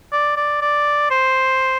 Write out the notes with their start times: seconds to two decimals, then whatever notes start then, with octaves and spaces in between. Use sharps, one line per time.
0.12 D5
0.37 D5
0.62 D5
1.11 C5